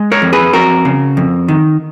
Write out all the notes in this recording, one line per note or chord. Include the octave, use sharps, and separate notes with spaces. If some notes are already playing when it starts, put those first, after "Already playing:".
Already playing: G#3
A#4 C#5
F2
G#4 B4
F2 F#4 A#4
C#3
F2
D#3